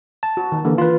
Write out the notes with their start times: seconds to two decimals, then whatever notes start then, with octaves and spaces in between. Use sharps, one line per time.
0.23 A5
0.37 F#4
0.52 D#3
0.65 D3 E3 A#3
0.78 F4 B4